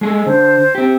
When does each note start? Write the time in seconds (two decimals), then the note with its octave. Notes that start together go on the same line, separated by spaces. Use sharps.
0.01 G#3 A3 G#4
0.26 D3 C5
0.75 C4 G4